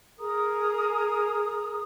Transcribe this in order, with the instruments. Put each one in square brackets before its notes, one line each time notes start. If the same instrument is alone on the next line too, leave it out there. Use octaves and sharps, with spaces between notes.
[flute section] G#4 A#4 A#5 D#6